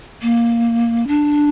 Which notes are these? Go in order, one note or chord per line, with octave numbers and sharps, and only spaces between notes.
A#3
D4